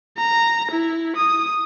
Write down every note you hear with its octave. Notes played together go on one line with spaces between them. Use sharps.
A#5
E4
D#6